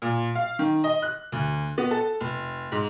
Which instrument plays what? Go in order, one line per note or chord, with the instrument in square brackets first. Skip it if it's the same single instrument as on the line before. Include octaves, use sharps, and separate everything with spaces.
[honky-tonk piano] A#2
F5
D#3
D#5
F#6
D2
B3
A4
F1
G#2